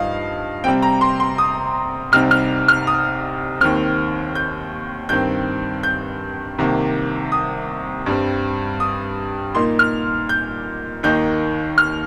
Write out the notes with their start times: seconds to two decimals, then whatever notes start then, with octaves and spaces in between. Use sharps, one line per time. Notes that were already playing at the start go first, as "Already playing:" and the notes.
Already playing: G2 F3 D#4 D#5 F5
0.64 C3 G3 C4 G5
0.82 A#5
1.01 C6
1.20 C6
1.38 D#6
2.12 C2 C3 G3 C4 D#4 F6
2.31 F6
2.68 F6
2.87 D#6
3.61 D#2 D#3 C4 F6
4.35 G6
5.09 G2 D#3 C4 G6
5.83 G6
6.58 C2 C3 D#3 A#3
7.32 D#6
8.06 G2 G3 C4
8.80 D#6
9.55 A#2 A#3 D#4 C6
9.79 F6
10.29 G6
11.03 D#2 D#3 A#3 D#4 G6
11.78 F6